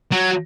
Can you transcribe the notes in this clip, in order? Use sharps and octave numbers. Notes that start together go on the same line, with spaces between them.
F#3